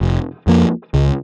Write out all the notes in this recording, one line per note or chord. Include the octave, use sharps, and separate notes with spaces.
F1
F2 F3 A#3
C#2